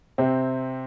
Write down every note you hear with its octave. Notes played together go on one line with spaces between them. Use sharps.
C3 C4